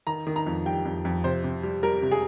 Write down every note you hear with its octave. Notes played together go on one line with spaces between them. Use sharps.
D#3 A#5
D#3
A#5
F2
G3 G5
F2
F2
C3 C5
C3
G3
G3 A#4
C3
G#4